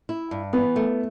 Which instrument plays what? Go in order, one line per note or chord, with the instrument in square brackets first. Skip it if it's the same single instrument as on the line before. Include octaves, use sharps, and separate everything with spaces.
[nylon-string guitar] E4
G2
[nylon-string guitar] E3 [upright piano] B3
[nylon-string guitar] A3